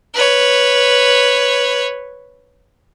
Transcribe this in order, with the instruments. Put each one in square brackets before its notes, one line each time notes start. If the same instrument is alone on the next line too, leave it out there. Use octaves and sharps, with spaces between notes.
[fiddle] B4 C#5